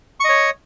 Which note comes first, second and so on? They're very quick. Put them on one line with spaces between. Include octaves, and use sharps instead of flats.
C#6 D#5 C#5